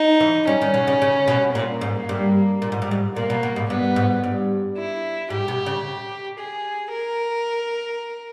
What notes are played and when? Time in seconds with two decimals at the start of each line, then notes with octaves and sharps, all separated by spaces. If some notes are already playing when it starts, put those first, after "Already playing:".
Already playing: D#4
0.20 E3
0.47 G3 C#4
0.61 D#3
0.74 B2
0.87 C#3
1.02 C#3
1.27 B2
1.55 A#2 A#3
1.81 G#2
2.09 G2
2.62 A#2
2.72 G#2
2.82 G2
2.91 G#2
3.16 A#2 A#3
3.30 B2
3.43 B2
3.56 G#2
3.70 G2 B3
3.96 G#2
4.24 G2
4.77 E4
5.30 G#2 G4
5.48 B2
5.66 C#3
6.38 G#4
6.91 A#4